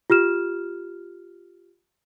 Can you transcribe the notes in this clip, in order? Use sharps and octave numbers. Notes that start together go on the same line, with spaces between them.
F4 G4 F6 E7